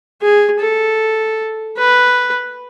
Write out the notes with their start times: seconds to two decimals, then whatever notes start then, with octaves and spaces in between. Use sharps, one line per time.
0.22 G#4
0.60 A4
1.77 B4